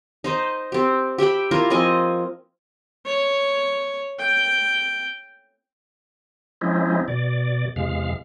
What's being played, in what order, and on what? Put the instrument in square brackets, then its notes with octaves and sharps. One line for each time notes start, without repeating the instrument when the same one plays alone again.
[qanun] D#4 C5 D#5
C4 G4
G4 E5 G5 B5
A#3 E4 F4 A#4
F3 C4 D#5 G#5
[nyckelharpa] C#5
G5
[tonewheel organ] F3 G#3 C4 C#4 D#4 E4
B2 D5
E2 C3 G#3 F5